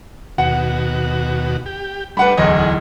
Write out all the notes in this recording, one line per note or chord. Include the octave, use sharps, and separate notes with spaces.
D#2 B2 F#4 F#5
G4
G3 A3 D4 B4 F#5 B5
D1 E2 D#4 G#4 D#5